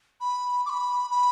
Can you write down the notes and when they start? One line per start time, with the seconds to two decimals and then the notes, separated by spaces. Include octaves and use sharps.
0.21 B5
0.66 D6
0.70 B5
1.11 B5